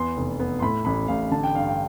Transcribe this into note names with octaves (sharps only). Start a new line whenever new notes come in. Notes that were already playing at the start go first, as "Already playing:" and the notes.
Already playing: E2 B3 C6
F1
B3
C6
A2 B5
A1 B5
A1 F5
D3 A5
G5
G2 F5
G5